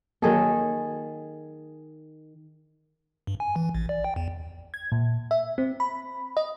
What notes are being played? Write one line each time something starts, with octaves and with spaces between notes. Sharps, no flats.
D#3 F#3 A#3 G#4 A4
G2
G#5
E3
A1
D5
G5
E2
G#6
A#2
E5
C4
B5
D#5